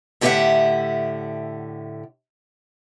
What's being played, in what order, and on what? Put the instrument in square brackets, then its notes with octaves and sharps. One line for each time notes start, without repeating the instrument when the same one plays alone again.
[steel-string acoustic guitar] A2 D3 G4 D#5 E5 F#5